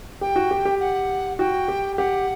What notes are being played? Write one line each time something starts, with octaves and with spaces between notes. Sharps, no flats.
G4 G5
F#4
G4
G4
F#5
F#4 G5
G4
G4 F#5